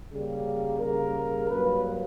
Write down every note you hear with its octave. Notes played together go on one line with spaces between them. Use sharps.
C#3 G3 A#3
C#3 G3 A#3 A#4
G2 F#3 A#3 B4